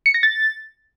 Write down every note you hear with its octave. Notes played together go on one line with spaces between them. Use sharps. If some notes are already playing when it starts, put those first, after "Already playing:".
C#7
A#6
A6